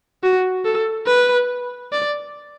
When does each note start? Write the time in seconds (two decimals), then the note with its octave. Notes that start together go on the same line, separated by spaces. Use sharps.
0.23 F#4
0.65 A4
1.07 B4
1.92 D5